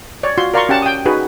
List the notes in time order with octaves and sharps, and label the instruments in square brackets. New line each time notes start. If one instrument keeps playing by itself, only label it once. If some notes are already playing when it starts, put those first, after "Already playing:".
[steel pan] C#5 D5
F4 F#4 C6
A#4 D5 F5 A#5 C6 C#6
C#4 G4 F#5 A5
G5 D#6
D#4 F#4 G#4 B4